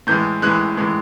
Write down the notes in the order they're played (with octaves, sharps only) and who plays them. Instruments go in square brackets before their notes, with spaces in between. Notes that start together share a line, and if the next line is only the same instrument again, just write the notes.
[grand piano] A2 E3 G#3 G6
A2 E3 G#3 F#6
A2 E3 G#3